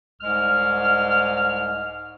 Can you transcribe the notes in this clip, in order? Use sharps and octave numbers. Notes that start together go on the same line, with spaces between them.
C2 G#2 G#3 F6